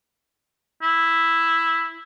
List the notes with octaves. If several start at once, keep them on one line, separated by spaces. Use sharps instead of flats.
E4